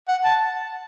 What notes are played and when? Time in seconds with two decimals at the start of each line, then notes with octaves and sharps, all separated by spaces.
0.08 F#5
0.25 A5